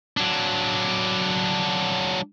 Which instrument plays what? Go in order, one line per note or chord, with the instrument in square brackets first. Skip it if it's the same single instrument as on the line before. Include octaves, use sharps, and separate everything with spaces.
[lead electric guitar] F#3 D4